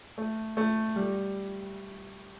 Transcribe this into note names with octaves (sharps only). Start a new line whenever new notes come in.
A3
A3
G3